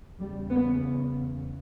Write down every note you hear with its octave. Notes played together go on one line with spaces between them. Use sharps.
E2 C#3 G3
B3